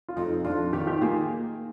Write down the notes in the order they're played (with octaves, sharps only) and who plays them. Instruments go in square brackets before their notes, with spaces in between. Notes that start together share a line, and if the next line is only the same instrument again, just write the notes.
[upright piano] F4
[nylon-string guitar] F2 [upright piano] C4 D#4
[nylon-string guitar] F2 [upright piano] D4 F4
[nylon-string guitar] D#3 [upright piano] G4
[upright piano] F4
D#4 G4
[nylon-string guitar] A#3 [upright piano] F4 G#4